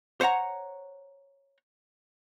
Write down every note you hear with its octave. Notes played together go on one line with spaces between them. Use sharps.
C5 C#5 F#5 A#5